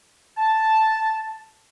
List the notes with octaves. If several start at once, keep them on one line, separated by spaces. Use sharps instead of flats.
A5